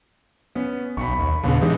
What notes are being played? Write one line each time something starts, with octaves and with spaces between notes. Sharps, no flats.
B3 C#4
B1 B5 C#6
D#2
D#1 A#1 C#3 B3
E3 G#3 D#4 G4